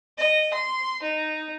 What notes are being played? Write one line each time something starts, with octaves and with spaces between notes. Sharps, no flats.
D#5
C6
D#4